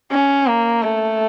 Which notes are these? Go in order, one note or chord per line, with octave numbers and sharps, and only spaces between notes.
C#4
A#3
A3